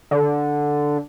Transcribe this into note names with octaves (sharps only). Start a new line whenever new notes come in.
D3